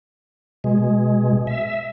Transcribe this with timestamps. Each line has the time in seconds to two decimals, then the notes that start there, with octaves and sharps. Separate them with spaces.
0.64 B2 G#3
1.47 E5